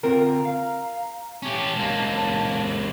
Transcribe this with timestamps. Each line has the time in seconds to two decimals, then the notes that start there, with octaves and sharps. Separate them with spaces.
0.03 D3 C4 F4 A#4 A#5
0.45 F5
1.43 C#4 G4 A5
1.76 C#2 A#3